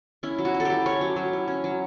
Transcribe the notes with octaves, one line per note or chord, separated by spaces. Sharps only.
C#4 E4
F#3
F#4
F#3
A4
E4 G4
C#4 C#5
F#3
F#3
E4
C#4
F#3